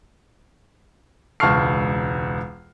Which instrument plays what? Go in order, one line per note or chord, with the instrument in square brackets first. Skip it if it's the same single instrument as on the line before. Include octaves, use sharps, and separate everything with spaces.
[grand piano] E1 C#2 A5 C#6 F6 C7